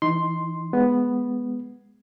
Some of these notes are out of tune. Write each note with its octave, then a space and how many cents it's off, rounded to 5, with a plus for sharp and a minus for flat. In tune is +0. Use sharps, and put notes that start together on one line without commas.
E3 +0 D#4 +0 C6 +0
G#3 +0 B3 +0